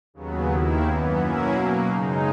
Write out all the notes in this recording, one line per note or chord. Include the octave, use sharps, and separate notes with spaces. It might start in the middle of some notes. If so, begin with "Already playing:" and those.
D#2 C#3 F#3 B3
D#2 D#3 A#3 E4
F#2 E3 B3
B2 F#3 A#3 C#4 E4
B2 F#3 A#3
F#2 C#3 G#3 D#4